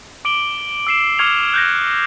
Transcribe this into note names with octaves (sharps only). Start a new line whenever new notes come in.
D6 D7 F#7 G7
E6 C7 E7
C#6 D6 F6 G#6 C#7 F7
F#6 G6 A#6